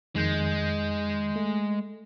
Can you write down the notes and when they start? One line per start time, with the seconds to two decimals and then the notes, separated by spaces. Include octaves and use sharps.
0.16 F2 D#3 G#3 G6
1.36 A3